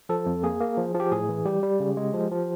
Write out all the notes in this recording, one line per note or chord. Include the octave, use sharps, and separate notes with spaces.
F3 A4
F2
A#3 G#4
A#3
F3
F3
G4
A2 G#4
E3
G3 G4
G3
C#3
G#3
F3
F3